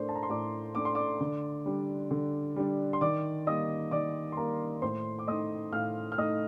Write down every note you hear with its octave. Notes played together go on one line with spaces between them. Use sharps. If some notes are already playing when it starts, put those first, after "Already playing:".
Already playing: A2 A3 D4 A#4 C5 C6
A5
A#5
C6
A2 D5 D6
A3 D4 D6
C6
D5 D6
D3
G3 D4
D3
G3 D4
C6
D#3 D5 D6
G3 A#3 D#5 D#6
D#3 D5 D6
C6
G3 A#3 A#4 A#5
A2 C5 C6
D6
A3 D#4 D#5 D#6
A2 F5 F6
F6
A3 D#4 D#5 D#6